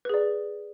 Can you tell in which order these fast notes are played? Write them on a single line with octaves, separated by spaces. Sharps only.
B4 G#4 D5